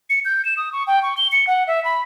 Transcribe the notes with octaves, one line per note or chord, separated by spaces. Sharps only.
C#7
G6
E7
D#6
C#6
G5
C#6
G7
C#7
F#5
E5
B5